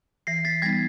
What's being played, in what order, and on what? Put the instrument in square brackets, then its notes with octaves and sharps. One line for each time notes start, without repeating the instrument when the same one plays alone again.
[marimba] E3 [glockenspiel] A#6 C7
[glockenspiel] A6 B6
[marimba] G3 B3 D#4 [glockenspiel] G#6 A#6